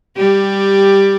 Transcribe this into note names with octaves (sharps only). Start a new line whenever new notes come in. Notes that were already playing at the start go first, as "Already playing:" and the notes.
G3 G4